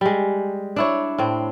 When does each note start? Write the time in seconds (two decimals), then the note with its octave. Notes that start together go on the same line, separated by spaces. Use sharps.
0.01 G3 G#3
0.76 D4 E4 C#5
1.18 A2 C4